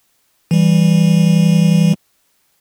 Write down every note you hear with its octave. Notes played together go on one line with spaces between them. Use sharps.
E3 G3